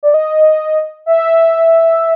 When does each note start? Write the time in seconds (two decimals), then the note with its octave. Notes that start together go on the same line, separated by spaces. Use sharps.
0.03 D5
0.14 D#5
1.06 E5